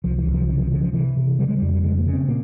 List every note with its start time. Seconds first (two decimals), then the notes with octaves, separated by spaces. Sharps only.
0.04 C2 F3
0.18 E3
0.26 C2
0.34 F3
0.49 C#3 E3
0.59 F3
0.71 C#3 F3
0.82 F3
0.93 C3 E3
1.17 C3
1.39 C#3 G3
1.48 G#3
1.58 F2 G3
1.73 G3
1.83 C#3 G#3
1.99 A#3
2.06 C#3
2.13 C4
2.28 A#2 A#3